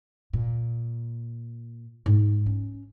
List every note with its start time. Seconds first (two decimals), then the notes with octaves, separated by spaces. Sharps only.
0.33 A#2
2.06 G#2
2.46 C#4